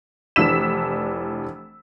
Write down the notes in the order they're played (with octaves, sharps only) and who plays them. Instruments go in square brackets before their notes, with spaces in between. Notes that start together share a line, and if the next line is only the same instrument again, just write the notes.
[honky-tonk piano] F1 E3 D4 E6 B6 E7